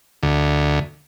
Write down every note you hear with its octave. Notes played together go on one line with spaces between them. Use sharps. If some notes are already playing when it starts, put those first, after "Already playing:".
D2